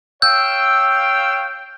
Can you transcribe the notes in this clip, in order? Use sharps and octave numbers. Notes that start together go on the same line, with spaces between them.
C#5 F5 G5 E6 G6